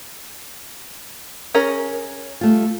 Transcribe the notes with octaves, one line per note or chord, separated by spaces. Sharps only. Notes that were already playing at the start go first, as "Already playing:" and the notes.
C#4 G#4 A#4
G3 A3 F4